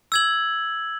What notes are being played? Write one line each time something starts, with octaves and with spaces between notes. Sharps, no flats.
E6 G#6 F#7